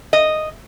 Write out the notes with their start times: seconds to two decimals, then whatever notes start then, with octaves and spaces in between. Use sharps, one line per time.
0.13 D#5